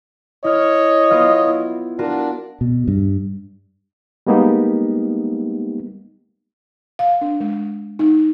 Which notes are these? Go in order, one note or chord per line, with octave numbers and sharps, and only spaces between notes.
E4 C#5 D#5 F6
B3 F4 F5
E4
D4 F4 F#4 A#4
B2
G2
G3 G#3 A#3 B3 D#4 G4
F5
D4
G#3
D#4